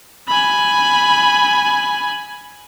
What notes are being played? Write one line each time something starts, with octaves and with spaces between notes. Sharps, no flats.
G#5 B5